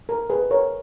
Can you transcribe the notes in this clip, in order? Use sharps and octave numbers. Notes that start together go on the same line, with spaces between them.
A#4
G#4 B4
A#4 C#5